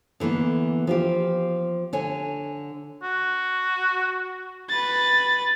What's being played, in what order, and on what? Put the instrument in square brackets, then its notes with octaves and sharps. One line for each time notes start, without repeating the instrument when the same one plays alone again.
[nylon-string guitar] D3 E3 A#3 B3
F3 F4 G4
D3 C#5 G#5
[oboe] F#4
[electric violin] B4 A6